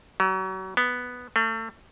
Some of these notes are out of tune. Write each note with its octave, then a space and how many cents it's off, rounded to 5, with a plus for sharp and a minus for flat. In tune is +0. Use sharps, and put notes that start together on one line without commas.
F#3 +35
B3 +0
A3 +35